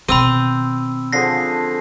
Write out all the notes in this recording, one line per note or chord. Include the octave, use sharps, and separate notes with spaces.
B2 D#3 C4 B5 E6 D#7
D3 F3 G#4 A#6 C7